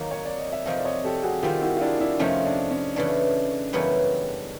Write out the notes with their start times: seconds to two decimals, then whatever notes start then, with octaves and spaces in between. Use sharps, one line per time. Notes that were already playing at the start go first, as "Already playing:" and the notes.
Already playing: D#3 F#3 A#3
0.11 C#5
0.25 D5
0.38 D#5
0.52 E5
0.66 F2 C3 F3 A3 D#5 F5
0.79 D5
0.85 C#5 D#5
1.04 G4 A4
1.23 F#4 G#4
1.43 D#3 G3 C4 F4 G4
1.62 E4 F#4
1.77 F4
1.81 D4 E4
2.00 D4 E4
2.19 F2 C3 F3 A3 C#4 D#4
2.45 D4
2.71 C#4
2.96 C#3 E3 A3 D4
3.73 F#2 C#3 E3 G3 B3